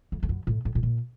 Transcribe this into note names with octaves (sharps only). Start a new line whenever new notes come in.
F2
F2
F#2
A2
A2
A2
A#2